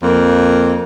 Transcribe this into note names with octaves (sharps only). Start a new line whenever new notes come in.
F2 A#3